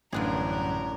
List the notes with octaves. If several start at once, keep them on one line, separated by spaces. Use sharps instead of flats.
A1 F#2 D3 F3 G3 D4 G#4 A#4